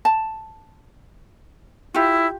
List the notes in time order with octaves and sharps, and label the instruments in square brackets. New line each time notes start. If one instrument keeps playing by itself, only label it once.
[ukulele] A5
[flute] E4 [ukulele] F4 G4